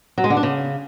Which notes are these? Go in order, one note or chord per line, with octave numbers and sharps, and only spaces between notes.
F#3
G#3
D3
D4
C#3